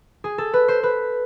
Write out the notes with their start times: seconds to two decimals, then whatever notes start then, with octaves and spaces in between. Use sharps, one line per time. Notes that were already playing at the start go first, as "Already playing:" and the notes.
0.24 G#4
0.38 A4
0.54 B4
0.68 C5
0.83 B4